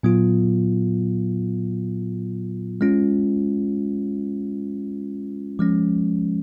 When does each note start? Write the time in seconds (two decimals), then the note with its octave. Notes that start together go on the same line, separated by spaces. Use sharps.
0.03 A#2 F#3 B3 F4
2.81 G#3 C#4 F4
5.59 F3 G#3 C#4